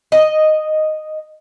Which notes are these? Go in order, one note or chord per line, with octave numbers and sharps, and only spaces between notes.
D#5